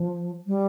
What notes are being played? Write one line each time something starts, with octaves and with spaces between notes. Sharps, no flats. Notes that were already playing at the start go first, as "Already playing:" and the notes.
Already playing: F3
G3